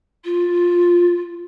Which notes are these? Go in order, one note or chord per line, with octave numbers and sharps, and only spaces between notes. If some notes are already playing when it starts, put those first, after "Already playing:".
F4